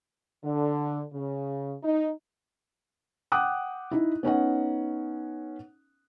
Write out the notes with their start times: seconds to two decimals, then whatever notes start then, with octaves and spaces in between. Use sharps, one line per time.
0.44 D3
1.13 C#3
1.83 D#4
3.32 F#5 G5 D6 D#6 F#6
3.91 D#4 E4
4.23 B3 C#4 D#4 F#5